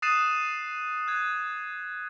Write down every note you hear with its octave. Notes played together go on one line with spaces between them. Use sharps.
D#6 F#6 A6 C7 D#7 E7
F#6 G#6